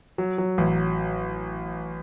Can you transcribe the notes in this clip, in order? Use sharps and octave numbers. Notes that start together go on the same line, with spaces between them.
F#3
F#3
A1